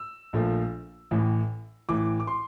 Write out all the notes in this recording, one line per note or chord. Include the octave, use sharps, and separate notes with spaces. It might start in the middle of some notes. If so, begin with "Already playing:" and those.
Already playing: E6
A#1 A#2 F3 A3
A1 A2 E3
A1 A2 E3 D6
D6
C6